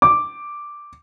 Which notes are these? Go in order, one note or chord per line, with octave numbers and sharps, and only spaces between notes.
D6